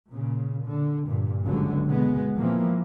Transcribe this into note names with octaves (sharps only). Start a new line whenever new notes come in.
A#2 C#3
D3
G2 A#2
G1 C#2 D3 F#3
B2 G#3 B3
A#2 E3 F3 A#3 C4